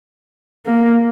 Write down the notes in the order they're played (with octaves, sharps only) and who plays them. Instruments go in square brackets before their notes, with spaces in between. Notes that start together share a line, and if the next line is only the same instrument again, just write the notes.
[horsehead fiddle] A#3